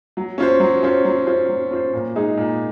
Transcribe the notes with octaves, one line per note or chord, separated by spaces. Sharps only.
F#3
C#4 F4 C5
F#3
C#4 F4 C5
F#3
C#4 F4 C5
F#3
C#4 F4 C5
A#2
G#3 D#4 G#4
A#2